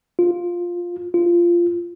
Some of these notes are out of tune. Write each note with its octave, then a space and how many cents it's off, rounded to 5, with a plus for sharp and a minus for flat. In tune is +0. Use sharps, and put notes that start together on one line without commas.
F4 +5
F4 -15